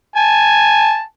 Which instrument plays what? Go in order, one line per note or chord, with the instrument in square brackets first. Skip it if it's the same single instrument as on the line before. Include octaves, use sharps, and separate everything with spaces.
[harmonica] G#5 A5